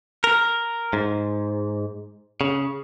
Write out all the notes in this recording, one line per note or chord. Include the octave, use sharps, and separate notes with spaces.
A#4
G#2
C#3